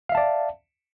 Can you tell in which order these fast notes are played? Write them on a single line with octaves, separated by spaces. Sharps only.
F5 E5 A5 D5